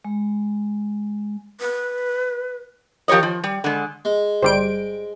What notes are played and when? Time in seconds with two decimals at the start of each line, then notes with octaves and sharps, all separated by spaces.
0.05 G#3
1.60 B4
3.08 F3 G4 A#4 C#5 D#5
3.23 F3
3.44 G3
3.64 D3 G#3
4.05 G#3
4.43 G1 G3 C5 D7